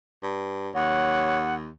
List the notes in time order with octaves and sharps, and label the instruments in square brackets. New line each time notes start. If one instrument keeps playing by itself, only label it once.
[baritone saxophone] G2
[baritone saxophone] D#2 [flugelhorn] C#5 [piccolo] F#5